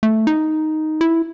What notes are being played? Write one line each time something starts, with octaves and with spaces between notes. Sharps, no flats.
A3
D#4
E4